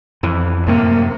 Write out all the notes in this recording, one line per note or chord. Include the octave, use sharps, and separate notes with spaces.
F2 E3
F#2 A2 C3 A#3